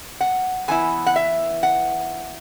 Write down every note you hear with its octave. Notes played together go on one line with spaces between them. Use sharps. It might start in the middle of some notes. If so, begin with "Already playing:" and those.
F#5
E3 B3 E4 G#5
F#5
E5
F#5